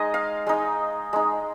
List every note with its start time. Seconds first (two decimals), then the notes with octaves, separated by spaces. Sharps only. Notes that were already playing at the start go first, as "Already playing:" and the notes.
Already playing: G#3 D#4 D#5
0.14 F5
0.47 G#3 D#4
1.13 G#3 D#4